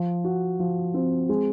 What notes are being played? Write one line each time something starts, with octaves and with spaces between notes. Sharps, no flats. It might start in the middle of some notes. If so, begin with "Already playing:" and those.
Already playing: F3
F#4
F3
C4
G#3